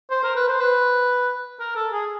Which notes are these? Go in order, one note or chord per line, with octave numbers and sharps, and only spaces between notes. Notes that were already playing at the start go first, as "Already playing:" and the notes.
C5
A#4
B4
C5
B4
A#4
A4
G#4